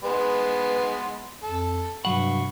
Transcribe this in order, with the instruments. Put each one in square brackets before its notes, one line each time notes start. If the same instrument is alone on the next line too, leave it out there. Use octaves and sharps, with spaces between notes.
[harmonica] G#3 B3 C6 [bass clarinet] B4
[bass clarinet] F2 [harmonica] A4
[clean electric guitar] C2 F#3 F#5 [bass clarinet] G2 [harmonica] B5 C#6